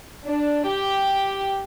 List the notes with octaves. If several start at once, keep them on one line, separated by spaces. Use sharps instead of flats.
D4
G4